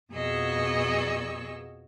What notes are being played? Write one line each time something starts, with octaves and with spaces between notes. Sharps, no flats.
F2 B2 G#4 D#5 C#6 E6